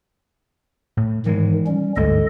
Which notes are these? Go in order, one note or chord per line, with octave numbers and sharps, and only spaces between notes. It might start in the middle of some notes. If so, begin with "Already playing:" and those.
A2
G#2 D#3 E3 G#3
G3 C#4
G1 D2 G#2 G#3 A4 D#5